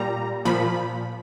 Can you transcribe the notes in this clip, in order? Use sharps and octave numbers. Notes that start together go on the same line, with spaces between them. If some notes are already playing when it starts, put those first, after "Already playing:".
Already playing: A#2 G3 A#5
A#2 F3 B5